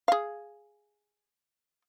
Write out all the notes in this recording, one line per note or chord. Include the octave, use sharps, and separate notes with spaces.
G#4 F5